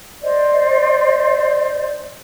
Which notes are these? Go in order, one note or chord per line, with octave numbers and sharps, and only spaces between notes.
C5 D5 D#5